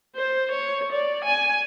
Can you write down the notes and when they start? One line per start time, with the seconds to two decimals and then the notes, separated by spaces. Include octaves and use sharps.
0.16 C5
0.51 C#5
0.92 D5
1.25 G#5